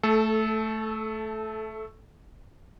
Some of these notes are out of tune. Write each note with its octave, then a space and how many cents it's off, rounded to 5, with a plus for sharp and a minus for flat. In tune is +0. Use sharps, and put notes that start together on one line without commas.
A3 +0 A4 -20